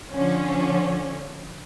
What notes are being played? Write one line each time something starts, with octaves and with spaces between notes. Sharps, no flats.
D3 F3 C#4